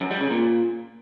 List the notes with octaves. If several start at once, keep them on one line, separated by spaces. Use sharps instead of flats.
F#2
G3
C#3
A#2